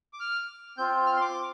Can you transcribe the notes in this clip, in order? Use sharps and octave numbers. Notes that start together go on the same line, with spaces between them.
D6
F6
C4 F4 G6
F6
C6
D6